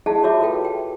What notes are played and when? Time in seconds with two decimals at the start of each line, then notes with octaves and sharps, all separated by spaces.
0.06 E4 G#4 D#5 F5 F#5 A5
0.23 F4 F#4 C#5 E5 D6
0.41 A4 B4 F5 G5
0.65 G5